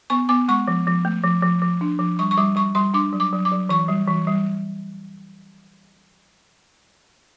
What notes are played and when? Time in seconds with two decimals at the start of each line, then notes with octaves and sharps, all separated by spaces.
0.10 B3 C#6
0.29 B3 D6
0.48 G#3 C#6
0.68 F3
0.87 F3
1.05 A3
1.23 F3
1.42 F3
1.62 F3
1.81 D4
1.99 F3
2.19 G3 C#6
2.31 C#6
2.37 G3 D6
2.56 G3 C#6
2.75 G3 C6
2.94 D4 D6
3.13 F#3
3.20 D6
3.33 F#3
3.45 D6
3.52 F#3
3.69 E3 C#6
3.88 G3
4.08 E3
4.27 G3